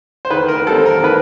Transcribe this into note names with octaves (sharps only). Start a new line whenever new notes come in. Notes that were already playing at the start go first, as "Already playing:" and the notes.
C5
D#3 B4
A#4
G3 C4 A4
A#4
D#3 B4